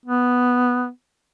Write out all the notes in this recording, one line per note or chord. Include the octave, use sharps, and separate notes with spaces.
B3